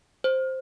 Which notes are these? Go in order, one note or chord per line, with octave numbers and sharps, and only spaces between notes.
C5